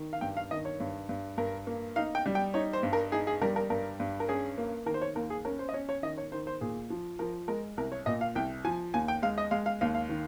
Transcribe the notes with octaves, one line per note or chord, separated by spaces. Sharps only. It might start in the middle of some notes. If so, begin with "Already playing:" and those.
Already playing: D#3
F5
G2 G5
F5
D#3 D#5
C#5
G2
G2
G2 A#4
A#3
D#4 F5
G5
G3
G5
D#4 C#5
C5
G2
A#4
D#4 G#4
G#4
G3 A#4
A#4
G2 A#4
G2
A#4
C#4 G#4
A#3
D#3 A#4
C5
C#5
D#2 A#4
G#4
C#4 A#4
C5
D#5
C#4 C#5
C#5
D#3 D#5
C#5
D#3 C5
C5
A#2 G#4
F3
F3 A#4
G#3 A#4
C2 A#4
C#5
A#2 D#5
F5
C2 G5
F3 G#5
D#2 G#5
G5
G#3 F5
D#5
G#3 F5
F5
D#2 F5
F5
D#3